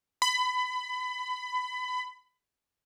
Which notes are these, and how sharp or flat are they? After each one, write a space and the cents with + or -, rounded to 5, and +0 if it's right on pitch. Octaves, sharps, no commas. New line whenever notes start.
B5 +25